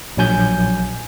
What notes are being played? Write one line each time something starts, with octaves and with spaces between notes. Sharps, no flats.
A#1 F#3 G#5 G6